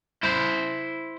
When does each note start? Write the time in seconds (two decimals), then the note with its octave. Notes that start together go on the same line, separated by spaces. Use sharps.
0.23 E4 C5